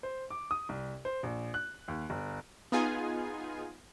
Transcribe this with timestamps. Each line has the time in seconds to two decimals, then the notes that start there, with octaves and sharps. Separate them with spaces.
0.03 C5
0.30 D6
0.51 D#6
0.69 C2
1.05 C5
1.23 A#1
1.54 F#6
1.88 D#2
2.10 G1
2.72 B3 D#4 F4 G#4 G#5